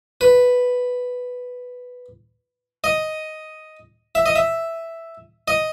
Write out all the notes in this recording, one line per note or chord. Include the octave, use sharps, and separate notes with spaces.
B4
D#5
E5
D#5
E5
D#5